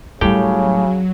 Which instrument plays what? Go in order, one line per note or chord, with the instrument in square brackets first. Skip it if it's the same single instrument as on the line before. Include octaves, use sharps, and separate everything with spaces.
[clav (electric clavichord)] A2 G4 G5 [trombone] C#3 [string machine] F#3 [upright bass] G3 C#4